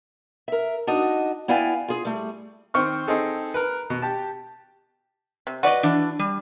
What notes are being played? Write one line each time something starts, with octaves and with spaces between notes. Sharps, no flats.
A#4 E5
D4 D#4 F#4 D#5
B3 E4 D5 F5 G5 G#5
F4 G#4
G3 A3
D#3 C4 C5 C#6 F6
C4 D#4 G#4 A4
A#4 B4
B2
G4 A5
C3
F#4 B4 D5 D#5
E3 D4
G3